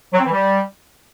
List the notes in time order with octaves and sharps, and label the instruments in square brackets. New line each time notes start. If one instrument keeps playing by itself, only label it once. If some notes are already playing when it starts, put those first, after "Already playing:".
[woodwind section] F#3
C4
E3
G3